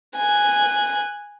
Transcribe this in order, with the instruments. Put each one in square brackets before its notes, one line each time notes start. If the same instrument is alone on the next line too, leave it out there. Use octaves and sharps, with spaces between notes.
[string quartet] G#5 F#6